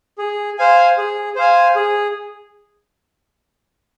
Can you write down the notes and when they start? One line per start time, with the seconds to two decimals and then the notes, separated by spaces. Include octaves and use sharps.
0.18 G#4
0.58 C5 F5 G#5
0.98 G#4
1.36 C5 F5 G#5
1.76 G#4